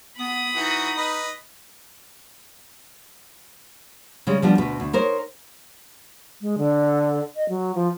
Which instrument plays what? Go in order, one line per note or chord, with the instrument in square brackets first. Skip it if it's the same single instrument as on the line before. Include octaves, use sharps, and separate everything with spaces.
[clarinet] B3 [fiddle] B5 D#6
[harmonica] E3 F#4 [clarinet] D#4
[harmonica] B4 D#5
[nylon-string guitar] C#3 G3 G#3
F3 G3 B3 D4
D2 B2 B4
D2
D#4 A#4 C5 C#5
[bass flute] G#3
D3
D#5
F#3
F3